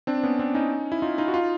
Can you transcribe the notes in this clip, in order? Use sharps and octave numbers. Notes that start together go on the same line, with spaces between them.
C4 D4
B3 C#4
C4 D4
C#4 D#4
E4
D#4 F4
D#4 F4
F#4
D#4 F4